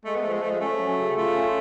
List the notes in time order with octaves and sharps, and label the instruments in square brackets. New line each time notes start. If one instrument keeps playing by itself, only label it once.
[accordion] G#3 [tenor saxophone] A3
[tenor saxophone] B3
[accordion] F3 [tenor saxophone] A3
[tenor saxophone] G#3
[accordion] F3 [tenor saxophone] A3
[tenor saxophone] G#3
[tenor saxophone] A3 [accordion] C#4
[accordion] F#3
C#3
[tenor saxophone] A3 [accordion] F4
[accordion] C#4